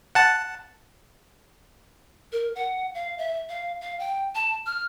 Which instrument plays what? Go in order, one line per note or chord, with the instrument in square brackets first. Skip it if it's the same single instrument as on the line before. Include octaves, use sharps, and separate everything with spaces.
[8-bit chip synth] F#5 A5
[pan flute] A#4
F#5
F5
E5
F5
F5
G5
A5
F6